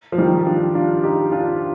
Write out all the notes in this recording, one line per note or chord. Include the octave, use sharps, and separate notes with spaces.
F3
D#3 G3
G4
D4 F4
D4 F4
D#4 G4
D4 F4